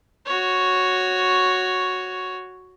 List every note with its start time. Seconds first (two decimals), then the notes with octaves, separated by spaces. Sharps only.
0.26 F#4 C#5